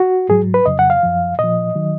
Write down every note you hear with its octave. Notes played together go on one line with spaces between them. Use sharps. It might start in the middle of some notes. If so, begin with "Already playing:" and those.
Already playing: F#4
G#2 F#3 G#4
B4
F2 C#3 F#3 D#5
F#5
F5
F#2 F3
A#2 F3 D#5
D#3 F#3